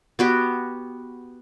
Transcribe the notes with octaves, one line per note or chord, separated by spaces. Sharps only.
B3 F#4 G4